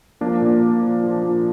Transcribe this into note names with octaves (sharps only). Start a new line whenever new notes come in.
F3 A#3 D4
A#2
A#2
F3
F3
A#2